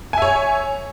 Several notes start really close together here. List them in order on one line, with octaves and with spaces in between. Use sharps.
G#5 E5 C#5